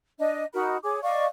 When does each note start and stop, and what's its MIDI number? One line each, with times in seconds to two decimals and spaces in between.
0.20 0.44 62
0.20 0.44 75
0.54 0.77 63
0.54 0.77 66
0.54 0.77 70
0.54 0.77 83
0.84 1.01 68
0.84 1.01 73
0.84 1.01 86
1.03 1.26 74
1.03 1.26 75
1.03 1.26 77
1.03 1.26 85